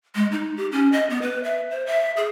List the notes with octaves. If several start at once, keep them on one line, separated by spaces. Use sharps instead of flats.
G#3
D#4
G4
C#4
D#5
B3
B4
E5
C5
E5
G#4